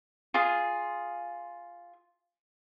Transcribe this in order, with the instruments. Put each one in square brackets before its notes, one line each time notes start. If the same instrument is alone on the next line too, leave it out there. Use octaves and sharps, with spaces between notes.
[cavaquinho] F4 G#4